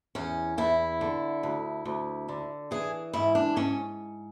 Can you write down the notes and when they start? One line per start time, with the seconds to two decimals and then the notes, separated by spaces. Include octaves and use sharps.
0.15 E2 C#4
0.58 E2 E4
1.01 D3
1.43 D2
1.85 D2
2.29 D3
2.71 E3 G#4
3.13 G#2 E4
3.35 D4
3.56 G#2 C#4